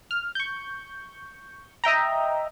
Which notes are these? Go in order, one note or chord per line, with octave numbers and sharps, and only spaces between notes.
F6
C#6 G6
D#5 E5 G5 A#5